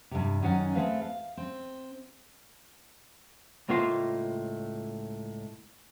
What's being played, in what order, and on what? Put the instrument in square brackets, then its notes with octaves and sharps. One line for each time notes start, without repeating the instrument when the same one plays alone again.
[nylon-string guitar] G2 C3
F#2 D#3 C#4 D5 F#5 G#5
A3 C4 G#4 B4 F5
F5
C4
[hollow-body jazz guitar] C#2 A2 A#3 F4 C5 C6